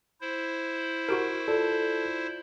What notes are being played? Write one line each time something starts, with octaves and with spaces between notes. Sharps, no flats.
E4 C5
F#4 G4 A#4 D7
F4 A4 D5